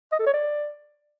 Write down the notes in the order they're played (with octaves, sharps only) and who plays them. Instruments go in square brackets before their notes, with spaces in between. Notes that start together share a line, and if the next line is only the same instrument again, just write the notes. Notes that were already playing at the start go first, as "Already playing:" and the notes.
[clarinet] D#5
A4
C#5
D5